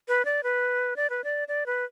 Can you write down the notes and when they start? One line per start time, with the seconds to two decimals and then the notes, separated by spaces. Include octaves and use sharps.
0.08 B4
0.25 D5
0.43 B4
0.96 D5
1.10 B4
1.24 D5
1.48 D5
1.66 B4